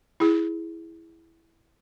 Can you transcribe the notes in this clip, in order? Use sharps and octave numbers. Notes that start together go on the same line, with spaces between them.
E4 G#4